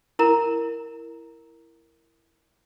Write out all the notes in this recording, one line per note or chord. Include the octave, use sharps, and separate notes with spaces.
E4 A#4 A#5